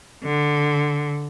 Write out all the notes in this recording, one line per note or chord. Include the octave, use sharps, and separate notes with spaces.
D3